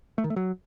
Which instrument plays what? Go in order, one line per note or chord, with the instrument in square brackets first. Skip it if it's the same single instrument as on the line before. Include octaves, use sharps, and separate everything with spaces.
[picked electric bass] A3
D#3
A3
F#3